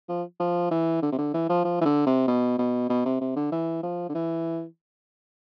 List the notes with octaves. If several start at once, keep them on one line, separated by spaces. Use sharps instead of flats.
F3
F3
E3
D3
C3
D3
E3
F3
F3
E3
D3
C3
B2
B2
B2
C3
C3
D3
E3
F3
D3
E3